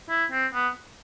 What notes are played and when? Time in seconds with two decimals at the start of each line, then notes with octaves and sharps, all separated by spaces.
0.09 E4
0.32 C4
0.53 B3